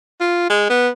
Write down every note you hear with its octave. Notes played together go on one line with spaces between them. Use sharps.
F4
G#3
B3